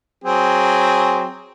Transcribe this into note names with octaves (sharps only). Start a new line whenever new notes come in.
F#3 C4 G#4